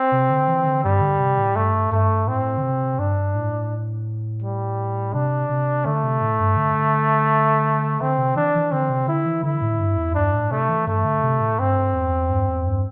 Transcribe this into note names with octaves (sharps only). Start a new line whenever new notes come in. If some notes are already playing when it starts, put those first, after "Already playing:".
Already playing: C4
C3
D3
E3
D3
G2 G3
D3
C3
A2
G2 A3
G2 A3
A2 C4
D3
C3
G2 D4
A2
G3
C3 D4
C3
D3 A3
C3
A2
G2
D3
D3 C4
C3
E3 D4
E3
D3 C4
C3
D3 E4
E3
D3 E4
A2
G2
E2
G2 D4
A2
C3 A3
E3
G2 A3
D3
C3
A2
G2 C4
E2
G2
E2
G2